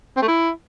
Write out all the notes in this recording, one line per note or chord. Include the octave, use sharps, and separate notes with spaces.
C4
A3
E4